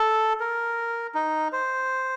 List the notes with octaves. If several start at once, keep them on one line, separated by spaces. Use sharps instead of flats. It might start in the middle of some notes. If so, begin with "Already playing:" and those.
Already playing: A4
A#4
D#4
C5